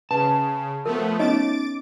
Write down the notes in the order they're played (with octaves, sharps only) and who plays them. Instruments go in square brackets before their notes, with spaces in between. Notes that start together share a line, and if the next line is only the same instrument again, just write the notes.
[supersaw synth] C#3 [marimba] B4 [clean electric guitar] A5
[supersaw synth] F3 A3 B3 [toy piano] A#4
[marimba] B3 C#4 [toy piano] D#4 C#5 D#5 [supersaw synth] D6 A6 D7